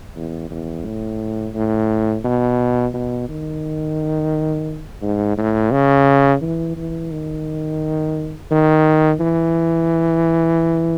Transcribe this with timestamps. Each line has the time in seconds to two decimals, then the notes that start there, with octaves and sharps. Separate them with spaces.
0.16 E2
0.50 E2
0.85 A2
1.54 A2
2.24 B2
2.94 B2
3.28 D#3
5.02 G#2
5.37 A2
5.72 C#3
6.42 E3
6.77 E3
7.11 D#3
8.51 D#3
9.20 E3